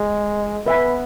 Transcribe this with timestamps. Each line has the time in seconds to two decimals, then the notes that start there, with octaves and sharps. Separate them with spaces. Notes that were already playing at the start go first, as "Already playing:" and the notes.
Already playing: G#3
0.66 B3 B4 E5 G#5 B5